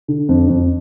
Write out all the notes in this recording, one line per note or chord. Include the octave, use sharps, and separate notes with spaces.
D3
F2
F2